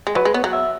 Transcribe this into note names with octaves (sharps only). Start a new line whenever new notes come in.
G#3
F#3 B4
G#3
B3 C#5
F#3 F#5
E5